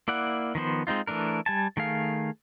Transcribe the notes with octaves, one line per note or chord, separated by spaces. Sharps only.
A#3 E4 D5 F#5
D#3 F3 B3 C5
G#3 C4 D#4 F4
E3 A3 D4 A#4
G3 G#5 A5
D#3 A3 G#4 F5